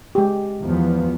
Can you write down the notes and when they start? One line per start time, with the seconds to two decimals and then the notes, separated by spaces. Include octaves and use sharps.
0.15 G#3 G4
0.61 E2 F3 B3